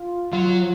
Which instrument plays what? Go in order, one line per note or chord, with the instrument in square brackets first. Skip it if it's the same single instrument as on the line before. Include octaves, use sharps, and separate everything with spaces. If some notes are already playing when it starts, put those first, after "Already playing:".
Already playing: [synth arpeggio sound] F4
[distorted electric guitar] F#3 [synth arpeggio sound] F4